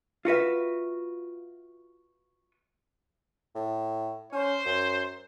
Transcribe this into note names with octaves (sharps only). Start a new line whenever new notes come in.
F4 F#4 B4 E5
A2
C#4 C5
F#2